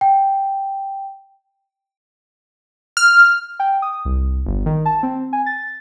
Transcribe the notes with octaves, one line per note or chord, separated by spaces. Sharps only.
G5
F6
G5
D#6
C2
G1
D#3
A5
C4
G#5
A6